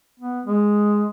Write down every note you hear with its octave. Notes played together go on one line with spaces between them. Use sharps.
B3
G#3